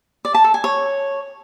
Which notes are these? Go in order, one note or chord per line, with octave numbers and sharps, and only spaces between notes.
D5
A5
A4
G#5
C#5